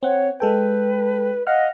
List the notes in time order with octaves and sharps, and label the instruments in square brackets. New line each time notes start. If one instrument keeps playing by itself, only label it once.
[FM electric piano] C4 F#5 [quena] C#5
[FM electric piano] G#3 A4 G5 [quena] B4
[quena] D#5 [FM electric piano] F5 F#5 F6